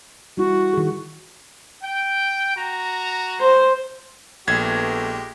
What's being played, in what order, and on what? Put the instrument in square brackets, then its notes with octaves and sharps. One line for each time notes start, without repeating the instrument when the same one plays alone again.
[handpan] G3 E4 [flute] F#4
[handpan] D#3 G#4
[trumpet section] G5
F#4 A#5
[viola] C5
[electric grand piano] A#1 G#6 [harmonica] G#3 G4 [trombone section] A3 B3